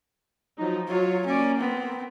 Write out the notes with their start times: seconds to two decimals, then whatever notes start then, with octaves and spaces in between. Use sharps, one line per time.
0.58 F3 F#3 D#4
0.88 F#3 F4 C#5
1.26 A#3 C#4 D5
1.57 B3 C4